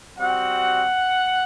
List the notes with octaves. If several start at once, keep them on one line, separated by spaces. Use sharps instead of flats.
G3 C4 F#4 F#5